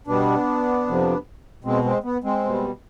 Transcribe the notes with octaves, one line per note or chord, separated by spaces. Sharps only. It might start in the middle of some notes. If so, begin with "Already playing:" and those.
B2 G3 B3 D4
F2 C3 F3
B2 G#3 C4
G#3 C4
B3
G#3 C4
B2 G3